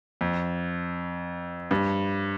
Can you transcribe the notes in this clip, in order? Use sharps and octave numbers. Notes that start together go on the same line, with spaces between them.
F2
G2